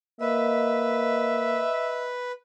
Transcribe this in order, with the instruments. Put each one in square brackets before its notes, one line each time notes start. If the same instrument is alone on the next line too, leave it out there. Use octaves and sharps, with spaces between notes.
[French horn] A#3 [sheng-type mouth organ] B4 [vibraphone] D#5 [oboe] E5